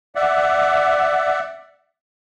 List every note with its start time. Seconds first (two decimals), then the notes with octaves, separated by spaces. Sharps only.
0.15 D5 E5 F#5